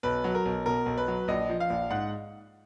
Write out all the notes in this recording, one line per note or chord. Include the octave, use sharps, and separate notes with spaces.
B1 B4
F#3
A#4
B1
B2 A#4
B1
B4
F#3
A#1 D#5
F3
F5
A#1
G#2 F#5